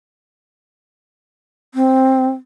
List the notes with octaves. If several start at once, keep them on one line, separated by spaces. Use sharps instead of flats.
C4